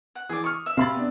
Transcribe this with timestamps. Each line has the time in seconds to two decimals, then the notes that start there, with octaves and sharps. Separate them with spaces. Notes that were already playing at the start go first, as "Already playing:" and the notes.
0.15 F#5
0.29 E3 G#4 D5
0.44 C#6 D#6 F6
0.66 E5
0.77 C3 F5 B5 A6
0.94 B3 D4